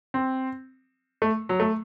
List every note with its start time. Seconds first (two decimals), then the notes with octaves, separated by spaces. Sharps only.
0.14 C4
1.22 A3
1.49 F#3
1.60 A3